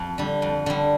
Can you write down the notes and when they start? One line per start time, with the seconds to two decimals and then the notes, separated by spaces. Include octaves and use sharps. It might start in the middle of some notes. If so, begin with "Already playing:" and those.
Already playing: F2
0.18 D3 G3
0.42 F2
0.66 D3 G3